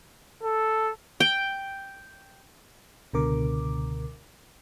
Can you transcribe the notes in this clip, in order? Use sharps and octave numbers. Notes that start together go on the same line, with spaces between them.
A4
G5
C#2 B2 D3 A#4 D6